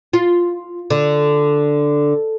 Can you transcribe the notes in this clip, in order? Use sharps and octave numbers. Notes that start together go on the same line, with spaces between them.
F4
D3